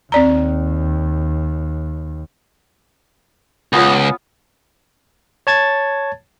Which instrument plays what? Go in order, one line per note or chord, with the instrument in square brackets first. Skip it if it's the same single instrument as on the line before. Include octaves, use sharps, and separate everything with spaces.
[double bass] D#2 [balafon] C4 D5 A#5
[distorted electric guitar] C#2 [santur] B3 F4 C#5
[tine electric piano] C#5 A5 G#6 A6